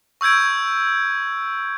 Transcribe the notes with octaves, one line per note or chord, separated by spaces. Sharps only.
C#6 E6 G6 G#6 D7